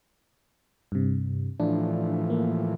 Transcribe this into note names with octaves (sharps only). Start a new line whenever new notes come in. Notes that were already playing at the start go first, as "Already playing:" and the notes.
G2 C3
A2 E3 F3 D4
A#3